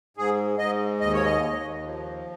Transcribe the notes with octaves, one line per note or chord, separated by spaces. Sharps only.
G#2 G#4
G#2 D#5
D#2 D#5
C#5
D#5
D#2
F3